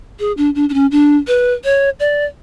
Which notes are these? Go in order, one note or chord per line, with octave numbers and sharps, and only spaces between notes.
G#4
D4
D4
D4
C#4
D4
B4
C#5
D5